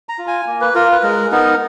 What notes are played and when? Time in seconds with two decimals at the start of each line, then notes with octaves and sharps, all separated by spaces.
0.09 A#5
0.18 F4
0.28 G#5
0.47 A#3
0.61 B4
0.75 F4 A#4
0.91 B4
1.03 G#3 A#4
1.32 B3 D#4 A#4